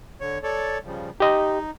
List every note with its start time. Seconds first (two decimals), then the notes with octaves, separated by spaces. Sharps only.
0.21 D3 C#5
0.43 A4 C#5 D5
0.85 C#3 F3 G3
1.20 D#4 G4 D#5